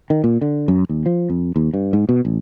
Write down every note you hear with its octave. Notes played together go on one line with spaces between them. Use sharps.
D#3
A#2
D3
F#2
D#2
F3
F2
D#2
G2
G#2
B2
A1